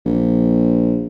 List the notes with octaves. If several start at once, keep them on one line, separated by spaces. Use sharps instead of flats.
A#1